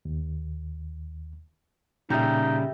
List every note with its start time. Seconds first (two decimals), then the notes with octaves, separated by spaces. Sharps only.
0.05 D#2
2.10 A#2 C#3 G3 D#4 G4 E5